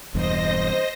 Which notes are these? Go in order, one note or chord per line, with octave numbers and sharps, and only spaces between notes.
E1 E2 G2 C5 D#5 A#6